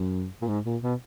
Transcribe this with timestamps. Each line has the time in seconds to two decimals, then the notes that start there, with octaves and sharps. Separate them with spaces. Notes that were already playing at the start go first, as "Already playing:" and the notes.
Already playing: F#2
0.42 A#2
0.48 G#2
0.65 A#2
0.82 B2